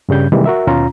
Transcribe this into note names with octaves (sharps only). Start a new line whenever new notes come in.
G2 C#3 G3 G6
C3 D#3 E3 G3 G#3 A#3
F#4 A#4 E5
D#2 B2 C#4 F4 A#5